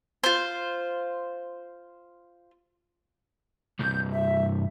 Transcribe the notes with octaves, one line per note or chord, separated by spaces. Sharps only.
F4 C5
C2 G2 G6
E5